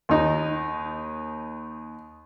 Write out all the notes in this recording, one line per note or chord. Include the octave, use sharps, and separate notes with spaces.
D#2 D#4